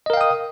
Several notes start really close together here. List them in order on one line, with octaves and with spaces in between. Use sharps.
D#5 A#4 F5 G5 D#6